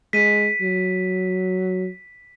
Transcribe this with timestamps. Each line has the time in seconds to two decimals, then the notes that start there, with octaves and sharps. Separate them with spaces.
0.13 G#3 B6 D#7
0.61 F#3